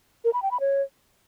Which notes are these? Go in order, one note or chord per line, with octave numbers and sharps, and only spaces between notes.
A#4
B5
G5
B5
C#5